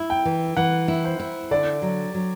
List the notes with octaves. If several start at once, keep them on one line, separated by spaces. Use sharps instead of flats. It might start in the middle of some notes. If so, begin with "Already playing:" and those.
Already playing: E4
G5
E3
E3 F#5
E4
C5
E4
D3 D5
F#3
F#3